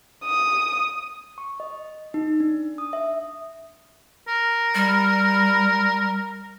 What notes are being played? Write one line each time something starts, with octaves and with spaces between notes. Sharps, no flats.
D#6
C#6
D#5
D#4
D4
D#6
E5
A#4
G3